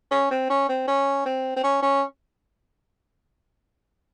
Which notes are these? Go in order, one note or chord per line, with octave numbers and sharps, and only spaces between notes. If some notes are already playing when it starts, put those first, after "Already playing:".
C#4
C4
C#4
C4
C#4
C4
C4
C#4
C#4